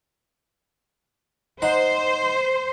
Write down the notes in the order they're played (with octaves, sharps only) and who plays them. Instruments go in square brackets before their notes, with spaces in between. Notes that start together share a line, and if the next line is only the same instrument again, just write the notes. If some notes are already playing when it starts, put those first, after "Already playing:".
[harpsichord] D#4 F#5 [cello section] C5